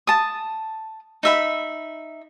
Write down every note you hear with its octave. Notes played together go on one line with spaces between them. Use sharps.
A5 D#6
D#4 E5 B5